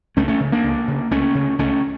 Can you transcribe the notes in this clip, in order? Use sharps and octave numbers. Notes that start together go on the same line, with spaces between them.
C#2 A3 C#4
A3 C#4
C#3
A#3 D4
C#2
C#3
C#2 A3 C#4
C#3
C#2 A3 C#4